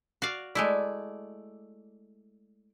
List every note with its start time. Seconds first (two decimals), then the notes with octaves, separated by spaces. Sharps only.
0.22 F#4 D5 F5
0.55 G#3 A3 E4 D5